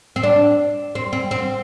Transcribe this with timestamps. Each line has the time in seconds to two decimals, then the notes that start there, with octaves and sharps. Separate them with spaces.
0.16 C4
0.23 D4
0.95 C4
1.13 C4
1.31 C4